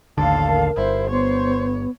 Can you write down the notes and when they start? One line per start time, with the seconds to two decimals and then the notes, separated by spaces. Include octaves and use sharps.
0.18 A1 D#2 D3 A4 F5 A5
0.48 A#4
0.77 G1 E4 C5
1.10 B3 C5 C#5 C6